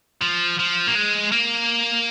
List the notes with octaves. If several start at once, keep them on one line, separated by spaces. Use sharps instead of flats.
F3
F3
A#3
G#3
A#3